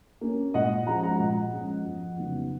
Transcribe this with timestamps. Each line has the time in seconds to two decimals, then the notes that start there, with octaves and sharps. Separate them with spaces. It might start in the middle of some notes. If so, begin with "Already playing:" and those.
0.21 A#3 C#4
0.54 A#2 D#5 F#5
0.87 F3 G#3 C#4 F#5 A#5
1.03 F#5 A#5
1.20 A#2 D#5 F#5
1.53 F3 G#3 C#4
1.85 F2
2.18 C#3 F#3 B3 D#4